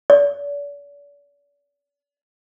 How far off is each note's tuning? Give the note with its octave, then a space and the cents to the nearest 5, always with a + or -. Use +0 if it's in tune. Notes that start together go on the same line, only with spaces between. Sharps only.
D5 -45